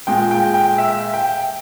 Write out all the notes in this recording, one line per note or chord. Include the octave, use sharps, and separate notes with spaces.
A#2 G#3 G5
G5
G5
E5
G5